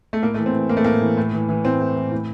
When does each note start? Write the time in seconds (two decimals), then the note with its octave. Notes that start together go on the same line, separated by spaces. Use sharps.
0.13 A3
0.22 A2 A#3
0.34 A3
0.38 E3
0.46 C4
0.54 E3
0.69 A2 A#3
0.77 A3
0.84 A2 A#3
1.01 E3
1.17 A2
1.33 E3
1.49 E3
1.64 A2 C4
1.80 A2
1.96 E3
2.12 A2